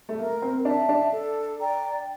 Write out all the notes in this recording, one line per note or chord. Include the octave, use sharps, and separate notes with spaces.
A3
A#3 A#4
C4
D4 E5 A5
D4
A4
D5 G5 A#5